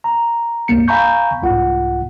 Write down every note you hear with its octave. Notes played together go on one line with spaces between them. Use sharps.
A#5
C#2 G2 A#3 C#7
F5 G#5 A#5 B5 C#6 G6
C2 G#2 F4 F#5